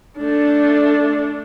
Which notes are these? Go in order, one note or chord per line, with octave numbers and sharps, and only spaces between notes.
A3 D4